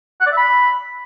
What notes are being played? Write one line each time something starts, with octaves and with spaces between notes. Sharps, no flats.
F#5
D5
E5
B5